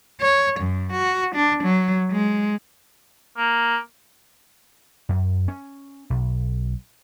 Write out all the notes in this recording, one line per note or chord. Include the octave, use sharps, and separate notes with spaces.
C#5
F#2
F#4
D4
F#3
G#3
A#3
F#2
C#4
B1